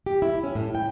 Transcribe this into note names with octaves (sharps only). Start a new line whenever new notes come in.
G4
E4
C#4
A2
G5